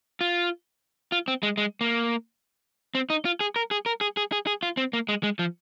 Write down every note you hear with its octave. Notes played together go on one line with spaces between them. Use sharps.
F4
F4
C4
G#3
G#3
A#3
C4
D#4
F4
G#4
A#4
G#4
A#4
G#4
G#4
G#4
G#4
F4
C4
A#3
G#3
G#3
F3